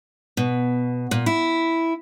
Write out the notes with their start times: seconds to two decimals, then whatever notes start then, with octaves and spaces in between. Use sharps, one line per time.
0.37 B2
1.11 A#2
1.26 E4